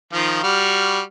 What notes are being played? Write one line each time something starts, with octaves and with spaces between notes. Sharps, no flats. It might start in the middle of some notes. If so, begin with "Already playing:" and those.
D#3 F3 F4
G3 F#4 F6